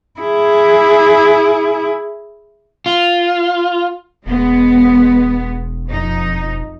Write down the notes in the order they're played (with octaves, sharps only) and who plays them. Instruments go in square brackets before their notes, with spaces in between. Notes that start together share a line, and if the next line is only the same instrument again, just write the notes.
[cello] E4 G#4
[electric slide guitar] F4
[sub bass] E1 [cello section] G#3 B3
[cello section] F2 D#4